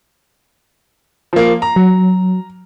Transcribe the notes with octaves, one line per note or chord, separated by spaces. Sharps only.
F3 A#3
A#5
F#3